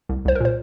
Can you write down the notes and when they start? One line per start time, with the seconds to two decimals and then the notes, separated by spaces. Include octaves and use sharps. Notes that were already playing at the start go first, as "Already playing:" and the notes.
0.09 C2
0.25 C2 C5
0.35 A#4
0.40 A#2 C5